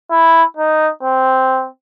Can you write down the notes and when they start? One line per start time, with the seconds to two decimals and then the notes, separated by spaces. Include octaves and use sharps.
0.11 E4
0.57 D#4
1.03 C4